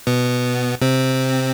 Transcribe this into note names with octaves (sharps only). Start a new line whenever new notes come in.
B2 B3
C3 C4